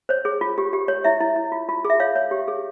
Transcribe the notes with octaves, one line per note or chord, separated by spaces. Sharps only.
C5 C#5
G#4
F4
G4
G4
C#5
E4 E5
E4
E4
F4
F4
G#4
E5
C#5 F5
C#5
G4
G#4